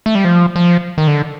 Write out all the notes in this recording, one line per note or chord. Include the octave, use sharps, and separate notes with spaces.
A3
G3
F3
F3
D#3
D3